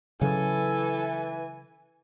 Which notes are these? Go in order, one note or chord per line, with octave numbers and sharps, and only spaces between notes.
C#3 E3 F#3 A4 G#5